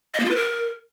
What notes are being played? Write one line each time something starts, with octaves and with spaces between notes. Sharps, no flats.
D#5
A#3
F4
B4
A#4